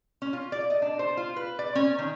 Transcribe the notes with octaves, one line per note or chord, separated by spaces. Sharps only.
C#4
F4
D5
D#5
D4
C5
F4
B4
D5
C#4
D#3